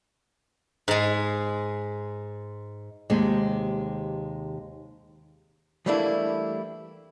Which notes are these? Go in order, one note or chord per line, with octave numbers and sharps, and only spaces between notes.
G#2 G#3
D#2 C3 G#3
E3 G3 A3 A#3 D4 E4